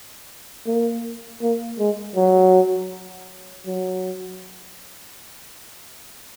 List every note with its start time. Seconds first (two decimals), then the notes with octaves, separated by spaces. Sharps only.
0.67 A#3
1.42 A#3
1.79 G#3
2.16 F#3
3.67 F#3